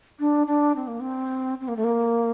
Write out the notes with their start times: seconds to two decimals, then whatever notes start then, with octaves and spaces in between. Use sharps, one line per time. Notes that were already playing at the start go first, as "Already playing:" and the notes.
0.19 D4
0.47 D4
0.76 C4
0.87 A#3
1.00 C4
1.61 C4
1.68 A#3
1.76 A3
1.84 A#3